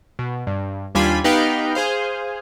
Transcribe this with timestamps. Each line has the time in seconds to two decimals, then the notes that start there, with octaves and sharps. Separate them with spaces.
0.19 B2
0.47 G2
0.95 D#2 G3 D4 F4 G#5 B5
1.24 B3 D#4 G4 B4 F5 G5
1.75 G#4 C5 F5